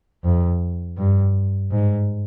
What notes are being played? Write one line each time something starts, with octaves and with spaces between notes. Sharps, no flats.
F2
G2
G#2